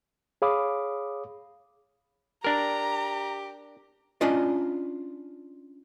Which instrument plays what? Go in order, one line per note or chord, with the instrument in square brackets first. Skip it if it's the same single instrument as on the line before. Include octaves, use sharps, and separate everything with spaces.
[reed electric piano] G#4 C#5 F5 B5 D6 D#6
[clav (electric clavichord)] D4 A#4 [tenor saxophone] G4 [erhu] A#5
[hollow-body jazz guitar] C#4 D4 F4 D5 D#5